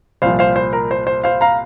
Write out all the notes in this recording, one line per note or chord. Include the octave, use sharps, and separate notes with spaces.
C2 A#2 F3 C5 F5
C5 F5
C5
A#4
C5
C5
C5 F5
F5 A#5